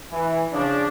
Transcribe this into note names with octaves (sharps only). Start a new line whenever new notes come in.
E3
C#3 F3 C#4 D4